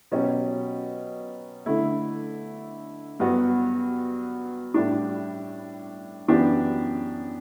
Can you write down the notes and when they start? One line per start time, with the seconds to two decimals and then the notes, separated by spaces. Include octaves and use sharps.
0.11 B2 F#3 C#4 G4
1.66 D3 A3 E4
3.20 G2 F#3 B3 F#4
4.74 A2 G3 D4
6.28 F#2 E3 B3 D4 G4